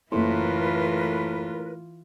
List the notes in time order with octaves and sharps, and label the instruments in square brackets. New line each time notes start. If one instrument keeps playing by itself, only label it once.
[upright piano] F#1 A3 C6 [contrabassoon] A2 [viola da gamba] E3 F4 [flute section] A#4 B4